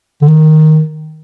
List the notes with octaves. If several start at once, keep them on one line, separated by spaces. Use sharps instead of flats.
D3
D#3